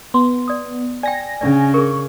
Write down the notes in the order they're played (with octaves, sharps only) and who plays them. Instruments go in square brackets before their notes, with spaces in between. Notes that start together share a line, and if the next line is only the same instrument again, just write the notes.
[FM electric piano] B3 [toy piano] C6
[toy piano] D5 D#6
[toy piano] D5 G5 [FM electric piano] G#5 A#6
[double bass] C#3 [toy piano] C#4 D4 D5
[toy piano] G#4 A#4 [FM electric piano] C#6